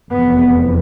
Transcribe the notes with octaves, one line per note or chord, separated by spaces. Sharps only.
F1 E2 C3 B3